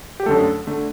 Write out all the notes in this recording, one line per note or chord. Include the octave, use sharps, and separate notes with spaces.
G4
F#2 D3 A3 A4
D3 A3